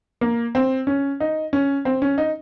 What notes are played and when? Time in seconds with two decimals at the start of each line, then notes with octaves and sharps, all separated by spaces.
0.21 A#3
0.55 C4
0.87 C#4
1.20 D#4
1.53 C#4
1.85 C4
2.02 C#4
2.18 D#4